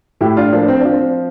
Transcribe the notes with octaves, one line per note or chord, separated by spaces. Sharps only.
A2 E4 G4
D4 F4
F3 A#3 D4
C4
F3 D4
C4